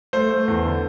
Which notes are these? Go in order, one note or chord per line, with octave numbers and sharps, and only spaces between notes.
A3 C5
A3
E2
D3